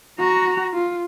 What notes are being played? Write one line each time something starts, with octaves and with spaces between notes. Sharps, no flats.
F#4 A#5
F4